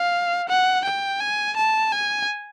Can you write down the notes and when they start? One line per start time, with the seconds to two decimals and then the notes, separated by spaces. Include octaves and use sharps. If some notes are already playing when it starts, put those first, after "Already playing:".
Already playing: F5
0.49 F#5
0.85 G5
1.21 G#5
1.57 A5
1.93 G#5